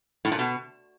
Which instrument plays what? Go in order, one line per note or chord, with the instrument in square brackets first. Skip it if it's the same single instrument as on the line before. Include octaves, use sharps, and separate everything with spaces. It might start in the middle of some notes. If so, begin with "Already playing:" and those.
[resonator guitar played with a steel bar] A2
A#2
B2